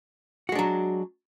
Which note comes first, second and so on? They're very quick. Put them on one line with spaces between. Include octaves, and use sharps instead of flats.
F#4 G#3 D4 F#3